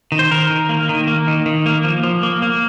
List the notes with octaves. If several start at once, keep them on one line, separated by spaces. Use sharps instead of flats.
D#3
C5
D#3 A#4
D#3
A#3
D#3
A#3
D#3
D#3
A#3
F3
F3
A#3
A#3